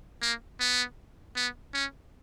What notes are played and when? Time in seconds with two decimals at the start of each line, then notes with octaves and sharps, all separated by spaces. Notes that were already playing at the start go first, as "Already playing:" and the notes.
0.22 A#3
0.60 B3
1.36 B3
1.74 C#4